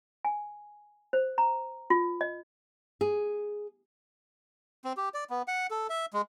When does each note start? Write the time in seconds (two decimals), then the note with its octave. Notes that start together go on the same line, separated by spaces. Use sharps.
0.25 G#5
1.13 C5
1.38 A#5
1.90 F4
2.21 D#5
3.01 G#4
4.84 C4
4.97 G4
5.14 D5
5.30 B3
5.48 F#5
5.71 A4
5.90 E5
6.13 G#3